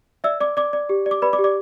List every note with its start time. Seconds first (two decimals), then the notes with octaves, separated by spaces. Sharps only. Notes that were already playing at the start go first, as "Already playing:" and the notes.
0.24 D5 E5 E6
0.41 D5 D6
0.57 D5 D6
0.73 D5
0.89 G4
1.06 D5
1.11 D6
1.22 B4 D5 B5
1.33 D5 D6
1.39 G4
1.44 D5 D6